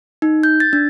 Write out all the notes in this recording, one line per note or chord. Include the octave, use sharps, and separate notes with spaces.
D#4
G6
A6
D4